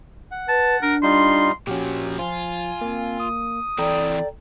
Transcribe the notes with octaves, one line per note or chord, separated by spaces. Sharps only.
F#5
B4 A5
D4 A#4
G3 D#4 F4 C6
A#2 F3 C#4 F#4 G4
F3 F4 G#5
A#3 C4
D#6
E3 C4 A4 D5 G5 A#5